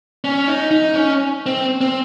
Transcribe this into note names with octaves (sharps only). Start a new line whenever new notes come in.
C#4
D#4
D#4
C#4
C4
C4